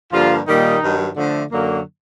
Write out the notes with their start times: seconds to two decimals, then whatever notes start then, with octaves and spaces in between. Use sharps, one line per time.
0.12 G2 D3 F3 G3 A#3 F4
0.47 A#2 D#3 G3 A#3 D#4
0.82 G2 D#3 F#3
1.16 D3 F3 A3
1.52 F#2 D3 F#3 A#3